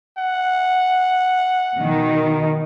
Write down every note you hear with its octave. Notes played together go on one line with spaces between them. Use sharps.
F#5
B2 D#3